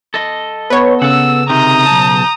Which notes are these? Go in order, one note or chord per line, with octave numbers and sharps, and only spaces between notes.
A4 D#5
B3 B4 C#5
C#3 A4 F#5 E6
C3 D#3 A#5 D#6 G6
B1 A5